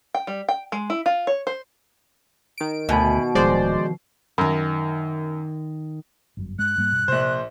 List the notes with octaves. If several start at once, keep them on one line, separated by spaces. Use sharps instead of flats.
G5
G3
G5
G#3
E4
F4
C#5
C5
D#3 D7
D2 B2 E5 G#5 B5
D1 D#3 F3 G#3 C5 D5 C7
F#2 D#3 A#4
G1 F#2
G2 G#3 F#6
G#2 G3 A#3
G2 B2
A#1 C3 C5